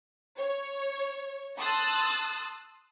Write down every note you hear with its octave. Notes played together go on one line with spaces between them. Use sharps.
C#5
A5 C6 D#6 E6 F#6 A6